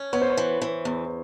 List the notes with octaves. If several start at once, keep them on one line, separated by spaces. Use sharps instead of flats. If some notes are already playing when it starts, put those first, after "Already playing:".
Already playing: C#4
B3 C#5
C5
C#5
E3
E3
E2